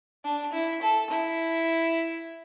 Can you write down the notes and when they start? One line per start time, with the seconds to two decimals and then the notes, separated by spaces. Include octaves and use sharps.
0.24 D4
0.53 E4
0.82 A4
1.11 E4